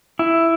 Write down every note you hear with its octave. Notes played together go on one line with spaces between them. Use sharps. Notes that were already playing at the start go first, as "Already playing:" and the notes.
E4